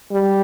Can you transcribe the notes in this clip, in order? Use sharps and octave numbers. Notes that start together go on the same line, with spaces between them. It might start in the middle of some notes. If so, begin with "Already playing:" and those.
G3